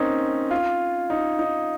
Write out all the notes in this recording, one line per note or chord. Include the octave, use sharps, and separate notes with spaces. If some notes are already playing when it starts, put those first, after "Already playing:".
Already playing: A#3 C4 C#4 D#4
F4
D#4
D#4